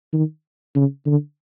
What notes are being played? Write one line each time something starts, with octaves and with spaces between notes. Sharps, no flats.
D#3
C#3
D3